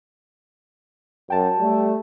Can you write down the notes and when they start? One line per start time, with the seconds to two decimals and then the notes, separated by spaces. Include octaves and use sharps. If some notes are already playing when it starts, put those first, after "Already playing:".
1.30 F#2 G5 A5
1.59 G3 A3